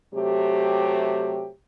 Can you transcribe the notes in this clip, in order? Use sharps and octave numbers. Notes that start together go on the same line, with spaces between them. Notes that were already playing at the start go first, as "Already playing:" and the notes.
C3 F#3 A3 G4